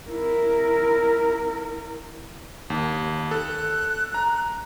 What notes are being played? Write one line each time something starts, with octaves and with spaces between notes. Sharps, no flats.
E4 A#4
D#2
A4 F#6
A#5